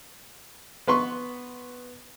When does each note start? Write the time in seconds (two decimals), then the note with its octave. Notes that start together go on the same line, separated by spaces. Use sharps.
0.87 B3 B4 C6 C#6